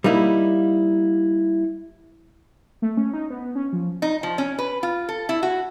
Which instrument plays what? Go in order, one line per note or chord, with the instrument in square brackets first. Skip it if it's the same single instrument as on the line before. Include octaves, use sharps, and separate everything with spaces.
[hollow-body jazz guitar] G3 A#3 D#4 E4
[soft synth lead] A3
C#4
D#4
B3
C#4
F3
[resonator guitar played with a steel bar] D#4
F3
C#4
B4
F4
A4
E4
F#4